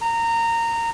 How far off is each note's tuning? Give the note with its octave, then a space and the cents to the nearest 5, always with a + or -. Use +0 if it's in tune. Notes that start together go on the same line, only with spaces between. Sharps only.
A#5 -20